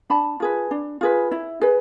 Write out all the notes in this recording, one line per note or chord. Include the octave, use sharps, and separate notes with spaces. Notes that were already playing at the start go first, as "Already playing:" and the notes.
D4 A5 B5
F4 G#4 B4
D4
F4 G#4 B4
E4
G#4 B4